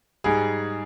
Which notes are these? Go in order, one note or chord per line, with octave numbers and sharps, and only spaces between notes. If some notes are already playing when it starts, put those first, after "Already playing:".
G#2 G3 G#4